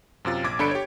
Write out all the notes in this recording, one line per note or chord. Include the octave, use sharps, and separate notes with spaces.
F#2 C3 F4 A6
A#1 D6 G#6
G1 D4 A4 B5 C#7 D7
G4 C#5